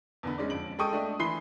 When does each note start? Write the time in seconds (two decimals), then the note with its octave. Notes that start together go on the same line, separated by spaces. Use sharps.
0.23 E2 D3 B3
0.38 G#3 C#4 D#4 D5
0.50 F2 D7 F#7
0.79 G#3 A4 G5 C#6 D#6 D#7
0.93 A3 D4 D#5
1.19 E3 B5 C6 C7 G7